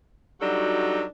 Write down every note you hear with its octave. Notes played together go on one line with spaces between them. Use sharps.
F#3 G3 D4 D#4 F#4 A4